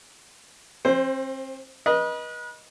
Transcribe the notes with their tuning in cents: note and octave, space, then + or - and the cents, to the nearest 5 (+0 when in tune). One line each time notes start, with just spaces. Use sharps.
C4 +35 C5 +0
B4 -35 D#5 +0